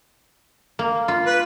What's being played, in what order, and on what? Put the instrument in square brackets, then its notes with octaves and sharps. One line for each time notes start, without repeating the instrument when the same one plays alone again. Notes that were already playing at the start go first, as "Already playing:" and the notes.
[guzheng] A#3
F4
[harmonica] B4